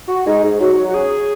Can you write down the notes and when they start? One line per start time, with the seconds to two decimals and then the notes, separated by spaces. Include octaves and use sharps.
0.08 F#4
0.26 G#3 D#4
0.43 G#2
0.60 F#3 F#4
0.77 F#3
0.88 F#4
0.94 C#4 G#4